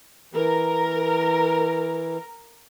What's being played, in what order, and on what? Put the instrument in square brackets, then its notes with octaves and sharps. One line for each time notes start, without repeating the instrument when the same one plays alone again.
[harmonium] E3 [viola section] A#4